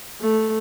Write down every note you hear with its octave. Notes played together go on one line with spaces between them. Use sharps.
A3